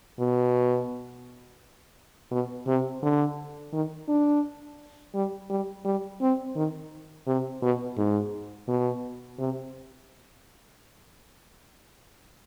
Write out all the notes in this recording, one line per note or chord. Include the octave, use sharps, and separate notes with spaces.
B2
B2
C3
D3
D#3
D4
G3
G3
G3
C4
D#3
C3
B2
G#2
B2
C3